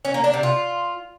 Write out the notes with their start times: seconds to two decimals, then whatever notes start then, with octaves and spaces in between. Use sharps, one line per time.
0.05 C#4
0.14 A#3
0.24 D4
0.34 C3
0.43 F4